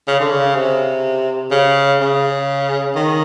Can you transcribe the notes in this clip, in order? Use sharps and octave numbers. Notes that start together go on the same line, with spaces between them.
C#3
D3
C#3
C3
C#3
C#3
D#3